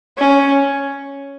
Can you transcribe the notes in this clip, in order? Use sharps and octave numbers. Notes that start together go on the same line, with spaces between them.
C#4